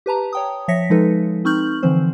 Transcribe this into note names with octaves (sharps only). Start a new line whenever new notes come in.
G4 B4 A5 A#5
C#5 G5 D#6
F3 C#5 E5 A#6 B6 C#7
F3 G#3 D#4 A4 B4
C4 D#4 C#6 F6 G6 F#7
D3 E3 F3 C4 C5